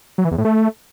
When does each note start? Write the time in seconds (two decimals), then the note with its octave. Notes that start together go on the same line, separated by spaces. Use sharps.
0.18 F#3
0.25 E3
0.31 E2
0.38 A2
0.45 A3